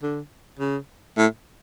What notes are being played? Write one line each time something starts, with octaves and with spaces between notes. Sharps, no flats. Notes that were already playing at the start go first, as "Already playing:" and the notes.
D3
C#3
A2